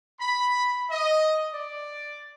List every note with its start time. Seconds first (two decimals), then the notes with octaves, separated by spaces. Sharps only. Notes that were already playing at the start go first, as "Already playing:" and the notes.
0.21 B5
0.91 D#5
1.54 D5